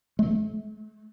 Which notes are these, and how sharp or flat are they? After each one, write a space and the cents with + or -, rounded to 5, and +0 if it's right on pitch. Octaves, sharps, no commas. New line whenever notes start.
A3 -40